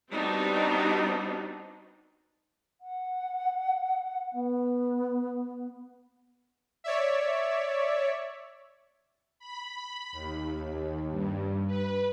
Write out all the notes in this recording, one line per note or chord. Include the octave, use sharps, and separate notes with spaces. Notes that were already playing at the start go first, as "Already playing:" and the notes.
G3 B3 C4 D4 D#4 F#4
F#5
B3
C#5 D5 E5
B5
D#2
G2
B4